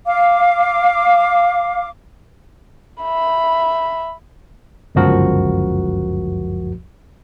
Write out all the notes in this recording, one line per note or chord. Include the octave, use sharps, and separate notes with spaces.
F5 D6
E5 B5
G1 C#2 F#2 F3 F#4 A#4